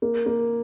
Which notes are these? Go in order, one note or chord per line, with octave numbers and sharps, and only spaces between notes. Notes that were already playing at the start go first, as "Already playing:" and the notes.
A#3
A#3